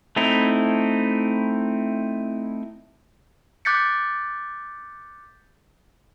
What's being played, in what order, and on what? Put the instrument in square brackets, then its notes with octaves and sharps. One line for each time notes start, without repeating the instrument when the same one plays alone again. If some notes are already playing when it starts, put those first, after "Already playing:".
[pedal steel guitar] A3 C4 D#4 E4
[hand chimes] D6 F#6 G6 A6 B6 C#7